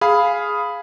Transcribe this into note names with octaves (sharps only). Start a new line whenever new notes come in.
G#4 F5 B5